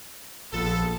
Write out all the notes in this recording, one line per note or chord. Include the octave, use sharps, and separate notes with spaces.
A#1 F3 B3 F4 A4